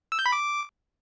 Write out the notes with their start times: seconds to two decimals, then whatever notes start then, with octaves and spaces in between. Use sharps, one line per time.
0.12 E6
0.19 G6
0.26 B5
0.32 D6